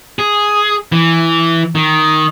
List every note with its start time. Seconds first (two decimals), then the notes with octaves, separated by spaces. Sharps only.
0.19 G#4
0.92 E3
1.75 D#3